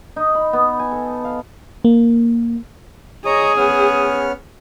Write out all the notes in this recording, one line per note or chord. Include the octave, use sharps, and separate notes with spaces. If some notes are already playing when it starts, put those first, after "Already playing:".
D#4
B5
B3
G#5
A4
F5
A#3
G#4 C#5 D#5 A#5 D#6
B3 C#4 F6